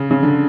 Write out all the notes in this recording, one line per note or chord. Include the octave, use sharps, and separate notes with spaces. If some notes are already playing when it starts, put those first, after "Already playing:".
Already playing: C#3
C#3
D3